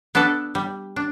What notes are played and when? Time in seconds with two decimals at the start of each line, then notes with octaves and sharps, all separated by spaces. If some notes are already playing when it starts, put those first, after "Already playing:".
0.15 B3 D4 A4 D5
0.55 G3
0.96 D4